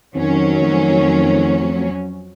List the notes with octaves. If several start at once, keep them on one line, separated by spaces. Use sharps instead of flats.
F2 D#3 F#3 C4 C#4
F3 A3 C4